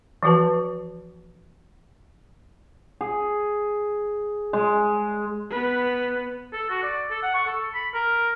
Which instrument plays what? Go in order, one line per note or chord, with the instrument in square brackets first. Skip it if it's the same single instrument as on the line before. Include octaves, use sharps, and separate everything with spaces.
[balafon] E3 F3 F#4 B4 A5
[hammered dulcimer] G#4
G#3
[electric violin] B3 B4
[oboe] A4
F#4
D5
A4
F#5
C#6
A4
B5
A#4